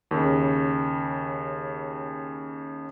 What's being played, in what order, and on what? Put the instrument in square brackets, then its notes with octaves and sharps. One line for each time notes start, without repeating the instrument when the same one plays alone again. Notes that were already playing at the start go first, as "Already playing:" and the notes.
[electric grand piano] D#2 C#3